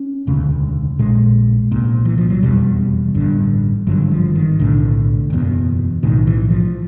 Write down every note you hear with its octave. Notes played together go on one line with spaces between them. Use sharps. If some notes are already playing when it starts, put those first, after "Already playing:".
Already playing: C#4
E1 D2 C#3
A#1 A#2 G#3
C2 A#2
E3
F3
F#3
F1 E2 B2 G3
A1 G2 D3
G#1 G2 D3 F#3
F3
D#3
B1 A2 D3
F#1 E2 B2
B1 A2 D#3
E3
F3